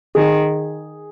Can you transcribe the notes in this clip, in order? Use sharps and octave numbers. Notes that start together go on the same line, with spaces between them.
D#3 G#4